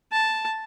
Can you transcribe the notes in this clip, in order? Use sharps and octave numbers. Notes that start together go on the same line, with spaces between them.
A5